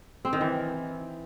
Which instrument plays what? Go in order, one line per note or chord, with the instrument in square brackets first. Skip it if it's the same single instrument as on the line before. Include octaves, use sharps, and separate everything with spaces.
[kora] C4
D#3
E3